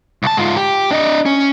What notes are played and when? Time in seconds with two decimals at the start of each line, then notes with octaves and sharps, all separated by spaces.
0.23 C2 A5
0.37 G#2 F4
0.57 G4
0.91 D4 D#5
1.26 C#4